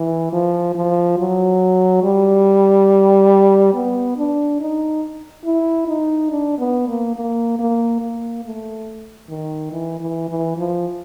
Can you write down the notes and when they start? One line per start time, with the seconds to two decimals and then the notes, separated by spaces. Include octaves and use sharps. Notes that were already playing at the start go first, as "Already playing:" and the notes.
Already playing: E3
0.32 F3
0.75 F3
1.18 F#3
2.03 G3
3.74 B3
4.17 D4
4.60 D#4
5.45 E4
5.88 D#4
6.31 D4
6.59 B3
6.88 A#3
7.16 A#3
7.59 A#3
8.02 A#3
8.44 A3
9.29 D#3
9.72 E3
10.00 E3
10.29 E3
10.57 F3